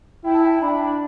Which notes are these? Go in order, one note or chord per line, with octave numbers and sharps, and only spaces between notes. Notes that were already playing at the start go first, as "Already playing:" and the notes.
E4 G5
A5
G5
D4 B5